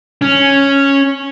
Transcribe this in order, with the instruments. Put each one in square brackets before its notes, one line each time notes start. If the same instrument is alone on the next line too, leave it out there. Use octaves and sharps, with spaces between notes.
[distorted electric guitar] C#4